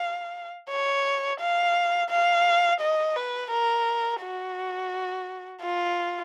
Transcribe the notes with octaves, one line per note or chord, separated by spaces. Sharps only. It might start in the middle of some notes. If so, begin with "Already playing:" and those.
Already playing: F5
C#5
F5
F5
D#5
B4
A#4
F#4
F4